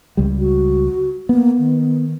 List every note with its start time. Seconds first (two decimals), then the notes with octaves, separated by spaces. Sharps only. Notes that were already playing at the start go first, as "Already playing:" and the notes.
0.17 C#2 G3
0.39 F#4
1.29 A#3 B3
1.59 D#3